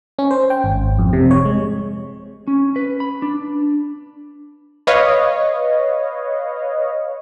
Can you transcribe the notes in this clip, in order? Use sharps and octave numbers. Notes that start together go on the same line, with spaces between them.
C#4
C5
G5
G#1
F2
C3
C#5
G#3
C#4
B4
B5
D4
B4 C#5 D#5 F5